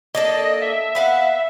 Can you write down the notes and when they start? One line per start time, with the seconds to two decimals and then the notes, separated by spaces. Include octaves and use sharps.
0.15 A#3 D4 A4 D#5
0.62 E5
0.95 B3 F5 F#5